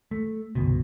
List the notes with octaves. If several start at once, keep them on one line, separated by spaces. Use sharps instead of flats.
A3
G1 C2 B2